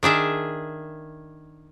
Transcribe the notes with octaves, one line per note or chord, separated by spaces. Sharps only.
D#3 D4 G#4 E5